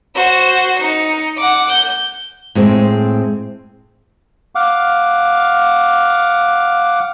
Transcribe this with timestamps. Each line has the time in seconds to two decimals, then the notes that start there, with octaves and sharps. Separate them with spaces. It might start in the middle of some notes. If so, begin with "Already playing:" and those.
0.15 F#4 C5
0.79 D#4 C#7
1.37 F#5 D6
1.72 G6
2.55 A2 G#3 C4
4.55 F5 F#5 D6